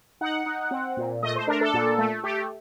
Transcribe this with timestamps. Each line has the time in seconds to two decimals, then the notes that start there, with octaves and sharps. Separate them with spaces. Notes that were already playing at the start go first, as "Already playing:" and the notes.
0.21 D#4 F#5
0.46 D#4
0.71 C4
0.97 A#2
1.23 A3 D#5
1.36 C5
1.47 D4 A#4
1.61 A4
1.74 A#2
1.98 A3
2.23 A3 G4